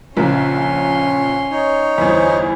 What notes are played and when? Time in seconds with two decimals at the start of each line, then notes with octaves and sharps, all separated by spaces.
0.17 A#1 C#3 C#4 A#4 C6
1.51 D#4 C#5
1.98 G1 E2 C5